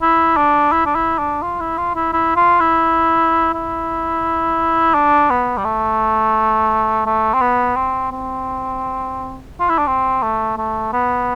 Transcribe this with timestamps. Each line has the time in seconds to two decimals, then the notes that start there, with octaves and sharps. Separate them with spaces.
0.02 E4
0.37 D4
0.72 E4
0.86 D4
0.95 E4
1.19 D4
1.42 F4
1.60 E4
1.78 F4
1.95 E4
2.13 E4
2.36 F4
2.60 E4
3.54 E4
4.94 D4
5.30 B3
5.57 G3
5.65 A3
7.06 A3
7.34 C4
7.41 B3
7.76 C4
8.11 C4
9.60 F4
9.69 E4
9.78 D4
9.87 C4
10.23 A3
10.57 A3
10.93 B3